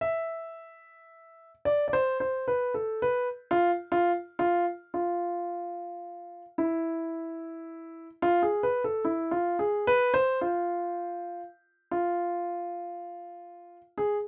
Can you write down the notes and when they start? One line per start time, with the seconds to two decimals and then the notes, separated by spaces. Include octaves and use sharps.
0.01 E5
1.65 D5
1.88 D5
1.93 C5
2.20 C5
2.48 B4
2.74 A4
3.02 B4
3.51 F4
3.92 F4
4.39 F4
4.94 F4
6.58 E4
8.22 F4
8.42 G#4
8.63 B4
8.84 A4
9.05 E4
9.31 F4
9.59 G#4
9.87 B4
10.14 C5
10.41 F4
11.91 F4
13.98 G#4